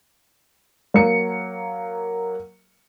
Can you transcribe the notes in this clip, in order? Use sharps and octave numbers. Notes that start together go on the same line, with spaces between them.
F#3 A#3 C#7